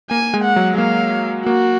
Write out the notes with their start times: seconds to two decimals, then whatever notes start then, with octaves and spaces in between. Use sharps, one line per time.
0.10 A#3 G#5
0.34 G#3
0.44 F#5
0.56 F#3
0.74 G#3
0.78 A#3 F5
1.46 A#3 F#4